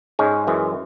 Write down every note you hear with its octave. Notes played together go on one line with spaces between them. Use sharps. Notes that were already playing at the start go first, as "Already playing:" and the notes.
G#2 G#3 C#4
F#2 E3 G#3